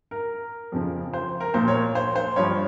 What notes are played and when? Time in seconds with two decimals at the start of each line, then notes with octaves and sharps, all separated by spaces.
0.11 A#4
0.72 F2 C#3 F3
1.13 C5
1.40 A#4
1.54 A#2 F3 C5
1.68 C#5
1.95 C5
2.16 C5
2.36 G2 F3 C#5